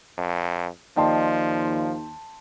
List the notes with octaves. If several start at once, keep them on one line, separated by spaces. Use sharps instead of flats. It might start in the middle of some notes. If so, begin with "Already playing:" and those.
F2
D#2 F3 D5 D#5 G5 A5 C6